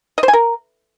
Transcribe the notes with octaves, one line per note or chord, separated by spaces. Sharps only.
D#5
C5
G#5
A#4